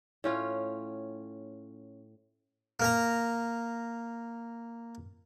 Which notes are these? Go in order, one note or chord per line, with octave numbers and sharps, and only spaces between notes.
A2 C#4 F4
A#3 A#5